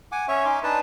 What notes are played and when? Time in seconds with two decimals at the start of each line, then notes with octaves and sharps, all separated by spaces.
0.12 F#5 G#5 D6
0.28 C#4 C#5 E5 C#6
0.45 C#4 D#4 C6 D6
0.63 D4 D#4 B4 A5